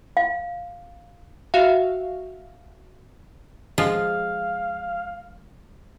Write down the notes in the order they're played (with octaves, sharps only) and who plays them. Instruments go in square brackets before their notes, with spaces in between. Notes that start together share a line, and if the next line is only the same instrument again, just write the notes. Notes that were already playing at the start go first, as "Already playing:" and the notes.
[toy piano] F5
[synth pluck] F#4 E5 F5
[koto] F3 G#3 F4 [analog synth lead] F5